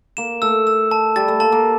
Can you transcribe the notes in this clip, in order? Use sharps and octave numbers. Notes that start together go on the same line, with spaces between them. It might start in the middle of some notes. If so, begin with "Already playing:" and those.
A#3 E7
A3 E6
E6
A5
G3 A6
A3
A#3 A5
A#3